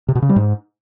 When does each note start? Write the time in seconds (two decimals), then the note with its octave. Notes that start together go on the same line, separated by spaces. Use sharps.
0.08 C3
0.15 B2
0.22 C#3
0.29 G3
0.36 G#2